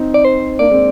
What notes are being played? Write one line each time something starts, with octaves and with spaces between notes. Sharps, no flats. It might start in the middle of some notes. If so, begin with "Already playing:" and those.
Already playing: C4 D#4
D5
C5
A#3 D4 D5
G#3 C4